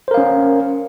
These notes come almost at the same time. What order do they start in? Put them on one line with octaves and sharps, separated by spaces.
C5 A#4 F5 C#4